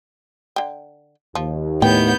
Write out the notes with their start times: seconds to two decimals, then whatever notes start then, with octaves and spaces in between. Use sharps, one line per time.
0.56 D3 G5
1.35 D#2 F3
1.82 A2 B3 G5 G6